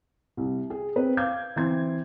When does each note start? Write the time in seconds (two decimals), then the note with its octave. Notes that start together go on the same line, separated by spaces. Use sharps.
0.37 C2
0.70 G#4
0.96 C4 B4
1.17 F5 D6 G6 G#6
1.56 E3 C4 C6 G#6